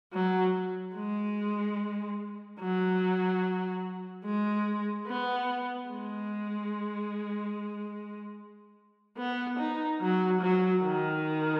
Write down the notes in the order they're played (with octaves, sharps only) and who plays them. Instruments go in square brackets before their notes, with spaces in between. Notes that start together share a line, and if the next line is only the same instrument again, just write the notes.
[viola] F#3
G#3
F#3
G#3
B3
G#3
B3
D#4
F#3
F#3
D#3